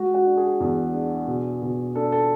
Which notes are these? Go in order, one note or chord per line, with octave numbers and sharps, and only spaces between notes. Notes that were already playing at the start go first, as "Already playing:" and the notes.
Already playing: G#3 F#4
F#4
D4
G#4
E2
D4
B2
B2
D4 A4
A4